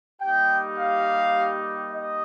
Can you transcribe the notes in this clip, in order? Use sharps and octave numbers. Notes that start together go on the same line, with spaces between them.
G3 A#3 D#4 G4 G5
F5
D#5